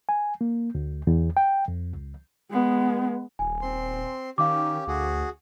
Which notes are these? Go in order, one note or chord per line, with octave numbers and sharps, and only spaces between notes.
G#5
A#3
D2
E2
G5
F2
C#2
G#3 B3
D#1 G#5
C4 C6
D#3 C#4 G4 F5 D6
D2 F#4 G#4